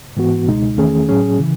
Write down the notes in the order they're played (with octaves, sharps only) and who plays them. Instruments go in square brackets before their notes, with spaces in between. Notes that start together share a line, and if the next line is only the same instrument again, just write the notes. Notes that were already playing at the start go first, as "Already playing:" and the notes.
[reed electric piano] G#2 E3 B3 F#4
C#2 B2 G#3 D#4
E2 D#3 A3 C#4 G#4
A2 F#3 C#4 G#4
C#3 E3